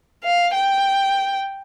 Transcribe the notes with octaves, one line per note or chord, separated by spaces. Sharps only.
F5
G5